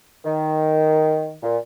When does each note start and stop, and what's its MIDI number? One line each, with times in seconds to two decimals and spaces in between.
0.24 1.33 51
1.43 1.56 46